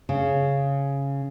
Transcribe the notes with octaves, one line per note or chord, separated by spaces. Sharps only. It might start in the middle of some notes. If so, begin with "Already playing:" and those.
C#3